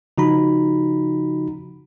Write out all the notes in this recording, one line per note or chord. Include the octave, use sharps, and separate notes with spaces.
C#3 F3 D#4 F#4 A#5 B5